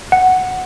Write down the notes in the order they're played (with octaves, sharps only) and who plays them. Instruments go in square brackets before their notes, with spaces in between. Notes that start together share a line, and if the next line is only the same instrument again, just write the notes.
[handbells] F#5